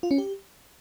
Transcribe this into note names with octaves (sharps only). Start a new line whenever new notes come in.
F4
C#4
G4